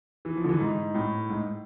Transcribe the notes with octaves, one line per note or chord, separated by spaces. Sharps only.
E3
F3
D3
E3
G#2
A2
G#2